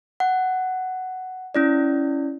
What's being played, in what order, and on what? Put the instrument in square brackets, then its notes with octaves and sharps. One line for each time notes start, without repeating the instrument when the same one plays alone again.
[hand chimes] F#5
C#4 E4 D5